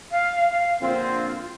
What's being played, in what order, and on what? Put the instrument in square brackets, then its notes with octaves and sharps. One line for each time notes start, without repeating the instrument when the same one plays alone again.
[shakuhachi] F5
F5
[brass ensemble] A#1 D3 C4 [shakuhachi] F4